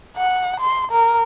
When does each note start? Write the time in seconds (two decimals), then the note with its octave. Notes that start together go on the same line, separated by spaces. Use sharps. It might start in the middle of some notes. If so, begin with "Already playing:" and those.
0.17 F#5
0.60 C6
0.91 A#4